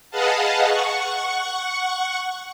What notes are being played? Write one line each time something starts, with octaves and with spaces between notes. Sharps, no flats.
G#4 B4 D#5 F5 F#5 A5
F#5 C#6